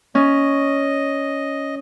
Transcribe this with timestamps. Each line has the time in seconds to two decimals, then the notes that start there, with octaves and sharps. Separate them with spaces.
0.15 C#4 D#5